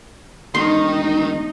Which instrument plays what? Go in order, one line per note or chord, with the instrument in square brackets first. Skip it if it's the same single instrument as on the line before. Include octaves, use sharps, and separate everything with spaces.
[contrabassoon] E1 [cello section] A2 D#4 [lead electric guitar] D#3 [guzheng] C6